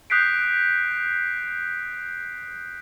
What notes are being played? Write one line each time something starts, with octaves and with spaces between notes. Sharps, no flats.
D#6 F#6 G6 B6 C7 D7